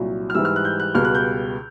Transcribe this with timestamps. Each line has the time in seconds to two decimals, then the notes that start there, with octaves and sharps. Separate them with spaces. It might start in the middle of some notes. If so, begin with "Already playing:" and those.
Already playing: C2 A#2 F#3
0.30 F6
0.35 G#2 E3 G3 E6
0.45 F6
0.56 F#6
0.65 G6
0.80 F#6
0.95 C#2 B2 G3 F6
1.05 F#6
1.15 G6